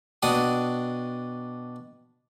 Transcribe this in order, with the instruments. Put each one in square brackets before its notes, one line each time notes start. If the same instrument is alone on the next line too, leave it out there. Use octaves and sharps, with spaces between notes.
[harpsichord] B2 D4 F#5 G5 D#6